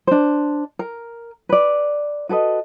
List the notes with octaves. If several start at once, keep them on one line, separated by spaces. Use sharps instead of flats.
D4 C5
A#4
B4 D5
F#4 A4 B4 D#5